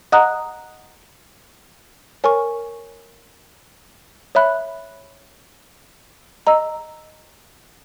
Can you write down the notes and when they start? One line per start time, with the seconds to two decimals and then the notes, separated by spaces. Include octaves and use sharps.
0.12 D#5 F#5 A#5 D#6 F#6
2.24 A#4 C#5 G#5 C#6
4.35 C#5 E5 B5 F#6
6.47 D#5 A#5 E6